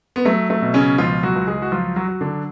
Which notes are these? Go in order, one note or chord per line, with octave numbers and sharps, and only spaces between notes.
B3
F#3 A3
A3
B2
C#3 C#4
C#2 F3 F4
F#3 F#4
C#2
G#3 G#4
F#4
F3 F#3 F4
F#3 F#4
F#3
D3 D4